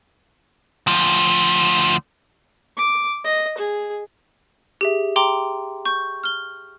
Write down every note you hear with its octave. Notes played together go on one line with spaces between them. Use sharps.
D2 F3
D6
D#5
G#4
G4 G#4 E5
G5 A#5 C6 D6
C#6 G6
F6 G7